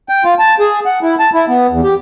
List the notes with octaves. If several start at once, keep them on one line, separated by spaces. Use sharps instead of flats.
G5
F4
A5
G#4
F#5
E4
A5
E4
B3
E2
G4